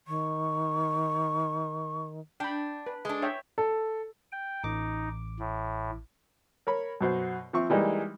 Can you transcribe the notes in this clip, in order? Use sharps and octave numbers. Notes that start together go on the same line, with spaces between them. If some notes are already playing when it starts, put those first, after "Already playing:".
D#3 C#6
D4 G5 B5
B4
G#3 D4
C#5 E5 G5
A4
G5
A1 D#4 D6
A2
A#4 C#5 B5
F#2 B2 C5 F#5
F3 C4 E5 C#6
E3 G3 G#3 A#3 D#4